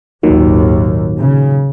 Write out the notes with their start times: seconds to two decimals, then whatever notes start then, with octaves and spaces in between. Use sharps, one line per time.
0.23 G#1 D#2 A#2 D#3 F#3
1.19 C#3